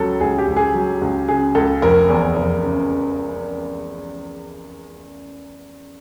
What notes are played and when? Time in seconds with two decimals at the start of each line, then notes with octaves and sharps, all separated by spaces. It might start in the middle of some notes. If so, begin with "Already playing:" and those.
Already playing: C#2 F#3 A4
0.21 C#2 G#4
0.38 G4
0.48 C#2
0.56 G#4
0.74 F#3
1.02 C#2
1.28 C#3 G#4
1.55 C#2 A4
1.82 F1 A#4
2.09 E2
2.36 F1
2.63 C#3